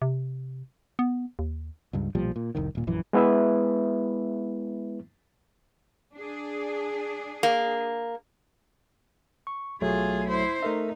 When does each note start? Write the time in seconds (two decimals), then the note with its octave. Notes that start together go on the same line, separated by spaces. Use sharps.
0.02 C3
0.99 B3
1.39 D#2
1.93 C#2 G2
2.15 B1 A#2 F3 G3
2.36 A#2
2.55 F1 C2 D#3
2.75 D#1 A#2
2.87 A#1 F#2 E3
3.13 G#3 B3 E4 B4 E5
6.15 D4 G#4
7.43 A#3
9.47 C#6
9.82 B1 F#3 A3 F4 G#4
10.28 E4 C5
10.63 A3 D#4 A#4 E5